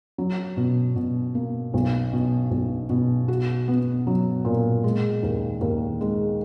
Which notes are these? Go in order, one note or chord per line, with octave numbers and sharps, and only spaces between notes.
F#3
B2
B2
A#3
B1
B2
B1
B2
F#4
B3
F#3
A#2
G#3
D#2
D#2
G#3